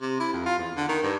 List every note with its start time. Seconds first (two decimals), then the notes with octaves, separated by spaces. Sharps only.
0.01 C3
0.20 E4
0.33 F2
0.46 F4
0.58 E2
0.76 D3
0.89 D#3
1.03 G2